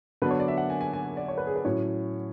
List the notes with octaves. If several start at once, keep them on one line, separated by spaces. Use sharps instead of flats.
D3 F#3 B3 D4 B4
C#5
D5
E5
F#5
G#5
G#5
G#5
D5
C#5
B4
G#4
B4
A2 F#3 C#4 C#5